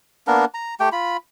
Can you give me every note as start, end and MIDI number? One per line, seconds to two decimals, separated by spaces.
0.27 0.45 58
0.27 0.45 59
0.27 0.45 62
0.27 0.45 70
0.54 0.75 82
0.80 0.89 57
0.80 0.89 67
0.80 0.89 79
0.92 1.17 65
0.92 1.17 83